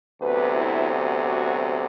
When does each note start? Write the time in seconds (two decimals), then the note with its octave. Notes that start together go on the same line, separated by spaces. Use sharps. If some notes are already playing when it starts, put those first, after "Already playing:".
0.20 D2 C3 F#3 B3 B4
0.55 E4
1.25 F#4